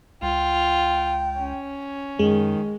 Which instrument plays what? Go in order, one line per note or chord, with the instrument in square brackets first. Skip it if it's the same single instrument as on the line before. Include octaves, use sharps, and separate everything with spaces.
[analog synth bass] C#2 [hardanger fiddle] F4 [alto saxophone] G5
[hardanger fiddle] C#4
[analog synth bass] F#2 [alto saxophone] D#3 [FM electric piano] G#3